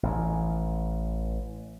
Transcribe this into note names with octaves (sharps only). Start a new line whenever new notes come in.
A1 E3